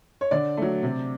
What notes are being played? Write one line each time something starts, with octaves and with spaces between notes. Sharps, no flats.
C#5
D3 D5
F#3 A3
C3